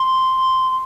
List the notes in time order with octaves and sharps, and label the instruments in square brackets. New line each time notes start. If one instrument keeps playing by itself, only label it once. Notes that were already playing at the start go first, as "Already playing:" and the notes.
Already playing: [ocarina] C6